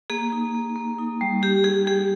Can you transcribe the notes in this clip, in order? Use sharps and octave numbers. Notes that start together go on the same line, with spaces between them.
A#3 G#4
D#4
A#3
A#3
D#4
G3
G3 G4
G3 G#4
G3 G#4